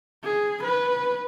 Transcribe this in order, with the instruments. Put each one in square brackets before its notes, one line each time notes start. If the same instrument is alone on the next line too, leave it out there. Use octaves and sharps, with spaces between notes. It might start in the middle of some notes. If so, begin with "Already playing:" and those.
[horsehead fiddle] G#4
B4